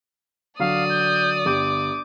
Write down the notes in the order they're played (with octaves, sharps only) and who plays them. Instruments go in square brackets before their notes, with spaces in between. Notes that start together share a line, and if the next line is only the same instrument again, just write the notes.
[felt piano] D3 F#3 [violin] D5 D#6 [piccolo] F5
[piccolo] G6
[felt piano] G1 G4 G6 [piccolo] D6